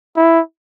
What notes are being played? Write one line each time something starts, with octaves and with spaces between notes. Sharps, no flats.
E4